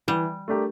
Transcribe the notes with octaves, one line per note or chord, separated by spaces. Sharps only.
E3 G3
A3 D4 G4 A#4